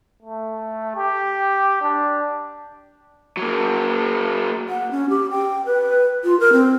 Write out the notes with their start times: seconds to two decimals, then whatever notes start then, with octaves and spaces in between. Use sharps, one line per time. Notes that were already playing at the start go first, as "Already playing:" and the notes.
0.22 A3
0.96 G4
1.82 D4
3.37 F#3 A#3
4.68 F#5
4.91 C#4
5.10 G4
5.31 G5
5.66 B4
6.24 F4
6.40 A#4
6.53 C4